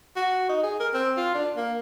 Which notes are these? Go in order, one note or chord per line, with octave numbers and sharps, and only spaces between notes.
F#4
D#4
G#4
A#4
C4
F4
D4
A#3